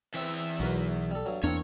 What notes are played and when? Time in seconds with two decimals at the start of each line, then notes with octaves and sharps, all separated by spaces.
0.15 E2 C4 B4 E5
0.60 B1 F#4 A#4 B4
1.11 G3 A4
1.26 G2 F#3
1.43 E2 A#3 C4 D4 C#5